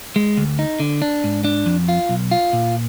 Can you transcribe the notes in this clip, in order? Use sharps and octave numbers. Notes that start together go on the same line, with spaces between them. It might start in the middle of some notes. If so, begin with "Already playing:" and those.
G#3
D2
D#4
D3
D4
G#2
D4
F2
F4
B1
F4
A#2